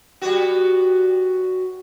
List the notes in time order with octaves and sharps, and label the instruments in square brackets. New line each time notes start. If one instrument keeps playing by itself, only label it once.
[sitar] G3 B3 F#4